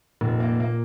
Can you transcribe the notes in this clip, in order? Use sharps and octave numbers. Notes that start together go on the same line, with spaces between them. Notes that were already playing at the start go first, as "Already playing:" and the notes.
F1 A#2
A#3
A#3